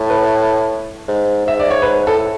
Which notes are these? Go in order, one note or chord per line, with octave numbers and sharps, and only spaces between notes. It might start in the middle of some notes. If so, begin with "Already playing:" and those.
Already playing: A2
B4
G#2
G#2 E5
D5
C#5
G#2 B4
A2 A4